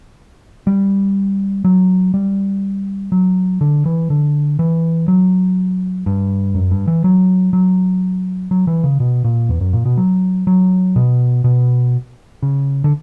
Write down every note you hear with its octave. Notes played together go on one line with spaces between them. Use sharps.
G3
F#3
G3
F#3
D3
E3
D3
E3
F#3
G2
F#2
G2
E3
F#3
F#3
F#3
E3
C#3
B2
A#2
E2
F#2
A#2
B2
F#3
F#3
B2
B2
C#3
D3